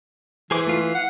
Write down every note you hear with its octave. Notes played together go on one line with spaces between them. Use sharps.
E3 G#4 C5 D6
A3 F4
F5
F#5